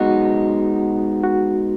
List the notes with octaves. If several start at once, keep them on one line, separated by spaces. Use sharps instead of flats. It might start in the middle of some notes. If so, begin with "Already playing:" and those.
Already playing: G#3 B3 D#4 F#4
F#4